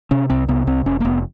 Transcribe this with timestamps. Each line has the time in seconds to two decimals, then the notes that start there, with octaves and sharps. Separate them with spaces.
0.11 C3 C#4
0.30 C2 C4
0.48 C3 B3
0.67 C2 C4
0.86 F1 C#4
1.00 A#3
1.05 F1 B3